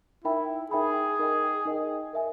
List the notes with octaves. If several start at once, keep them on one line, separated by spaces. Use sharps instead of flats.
D#4 E4 A#4 E5 G5 B5
D#4 G#4 A#4 E5 G5 B5
D#4 A#4 D#5 G5
D#4 A#4 D#5 G5
A#4 E5 G#5